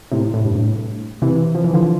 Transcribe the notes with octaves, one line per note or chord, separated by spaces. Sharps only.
A2 C3
A2
G2
A2
C3 E3
F3
E3
D3 F3